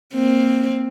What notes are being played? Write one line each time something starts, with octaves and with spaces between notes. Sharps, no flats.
A#3 C4